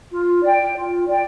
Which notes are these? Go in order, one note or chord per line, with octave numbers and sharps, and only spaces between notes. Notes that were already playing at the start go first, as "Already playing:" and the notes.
F4
D5 G5
F4
D5 G5